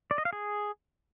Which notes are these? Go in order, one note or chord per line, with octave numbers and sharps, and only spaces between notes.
D5
D#5
F5
G#4